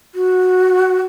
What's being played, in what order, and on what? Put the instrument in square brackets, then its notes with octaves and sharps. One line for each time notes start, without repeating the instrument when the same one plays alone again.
[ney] F#4